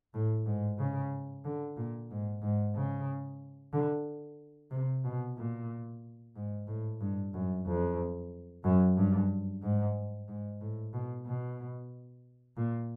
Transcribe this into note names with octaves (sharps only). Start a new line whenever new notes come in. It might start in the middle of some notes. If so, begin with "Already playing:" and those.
A2
G#2
C#3
D3
A#2
G#2
G#2
C#3
D3
C3
B2
A#2
G#2
A2
G2
F#2
F2
F#2
G2
G#2
G#2
A2
B2
B2
A#2